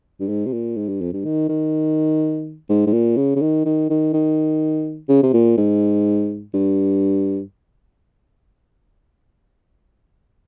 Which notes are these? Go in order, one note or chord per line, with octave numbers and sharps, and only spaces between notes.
G2
G#2
C3
A#2
G#2
G2
F2
G2
D#3
D#3
G#2
G#2
A#2
C#3
C#3
D#3
D#3
D#3
D#3
C#3
C3
A#2
G#2
G2